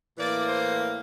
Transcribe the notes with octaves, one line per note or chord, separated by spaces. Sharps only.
A2 E3 A#3 D5
C5